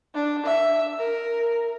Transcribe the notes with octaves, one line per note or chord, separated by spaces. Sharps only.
D4
E5
A#4